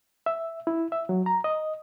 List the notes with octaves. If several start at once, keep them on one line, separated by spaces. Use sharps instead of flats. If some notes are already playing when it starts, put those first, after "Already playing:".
E5
E4
E5
F#3
A#5
D#5